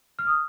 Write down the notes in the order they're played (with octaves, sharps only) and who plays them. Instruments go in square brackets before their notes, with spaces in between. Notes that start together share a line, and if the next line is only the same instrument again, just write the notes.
[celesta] F6
D#6